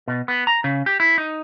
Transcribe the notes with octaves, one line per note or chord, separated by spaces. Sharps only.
B2
B3
A#5
C#3
G4
E4
D#4